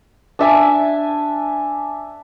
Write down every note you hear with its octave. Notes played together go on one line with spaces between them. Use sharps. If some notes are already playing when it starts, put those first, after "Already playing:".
D4 E5 G#5 A5